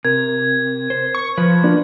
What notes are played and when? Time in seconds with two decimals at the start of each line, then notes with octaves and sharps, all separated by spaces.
0.05 C3 A#4 G#6
0.90 C5
1.15 C#6
1.37 F3 B4
1.64 A#3 D4 F4